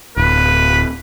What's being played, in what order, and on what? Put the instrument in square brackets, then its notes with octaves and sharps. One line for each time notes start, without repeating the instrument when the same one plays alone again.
[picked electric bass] D1 [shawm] B4